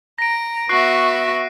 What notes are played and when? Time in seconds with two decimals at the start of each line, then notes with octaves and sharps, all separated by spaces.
0.18 A#5 A#6 D7
0.69 B3 F#4 E5 C#6 F#6 C7